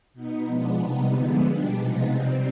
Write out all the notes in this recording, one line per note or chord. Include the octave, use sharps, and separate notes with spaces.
B2 B3 D#4
F3 G#3 B3 D4
C3 G3 B3 D#4
D3 F3 G#3 B3
B2 G3 D4
C3 F3 G#3 B3 D#4
C3 G3 C4